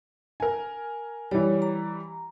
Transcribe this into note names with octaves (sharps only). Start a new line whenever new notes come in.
A#4 G#5
E3 G3 C#5
A#5